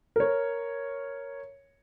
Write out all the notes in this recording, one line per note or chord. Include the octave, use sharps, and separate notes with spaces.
A#4 C#5